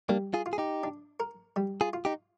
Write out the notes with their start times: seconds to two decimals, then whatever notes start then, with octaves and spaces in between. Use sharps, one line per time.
0.09 G3 A#3 D4
0.34 F4 G#4
0.46 F4
0.53 G#4
0.58 D#4 G4
0.83 D4
1.20 A#4
1.56 G3
1.81 F4 G#4
1.93 F4
2.05 D#4 G4